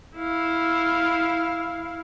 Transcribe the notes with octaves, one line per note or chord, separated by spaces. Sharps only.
E4 F5